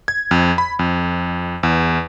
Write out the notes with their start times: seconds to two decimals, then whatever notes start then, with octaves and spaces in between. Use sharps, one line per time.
0.08 G#6
0.31 F2
0.58 B5
0.79 F2
1.63 E2